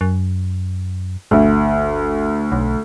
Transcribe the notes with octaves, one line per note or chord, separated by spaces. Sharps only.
F#2
G1 D2
B1